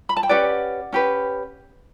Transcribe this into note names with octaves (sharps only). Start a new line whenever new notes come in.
B5
A5
G5
C#4 G4 B4 D5 F#5
C#4 G4 B4